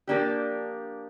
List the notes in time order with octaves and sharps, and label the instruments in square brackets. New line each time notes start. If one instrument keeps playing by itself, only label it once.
[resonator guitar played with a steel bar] F3 A#3 D4 G4